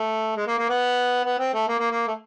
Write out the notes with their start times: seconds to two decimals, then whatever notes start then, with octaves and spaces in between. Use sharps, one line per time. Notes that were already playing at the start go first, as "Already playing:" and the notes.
Already playing: A3
0.36 G#3
0.47 A#3
0.58 A#3
0.69 B3
1.25 B3
1.39 C4
1.53 A3
1.68 A#3
1.79 A#3
1.91 A#3
2.07 A3